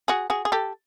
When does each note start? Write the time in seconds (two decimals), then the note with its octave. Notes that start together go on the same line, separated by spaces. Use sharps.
0.08 F#4 G#4
0.30 F#4 G#4
0.45 G#4
0.52 G4 A4